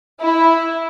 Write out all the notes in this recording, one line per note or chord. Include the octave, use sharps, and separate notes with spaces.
E4